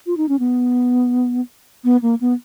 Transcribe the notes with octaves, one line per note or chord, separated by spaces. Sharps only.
F4
D#4
C#4
B3
B3
A#3
B3